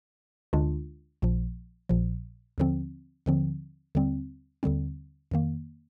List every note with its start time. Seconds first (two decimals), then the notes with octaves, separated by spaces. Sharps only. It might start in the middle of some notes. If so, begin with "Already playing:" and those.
0.53 D2 D3 G#3 D4 F4
1.22 A#1 A#2 F3
1.89 A#1 A#2 F3
2.58 D#2 D3 F3 C4
3.26 D#2 D3 F3 C4
3.95 D#2 D3 G3 C4
4.63 D#2 D3 G3 C4
5.31 F2 D#3 A#3